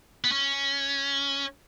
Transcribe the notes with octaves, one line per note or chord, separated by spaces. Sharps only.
B3
C#4